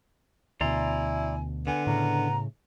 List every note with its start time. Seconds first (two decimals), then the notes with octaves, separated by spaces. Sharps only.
0.61 D2 B2 E4 D5 G#5 A#5 C6
1.67 D3 B3 G#5
1.87 A2 C#3 A#5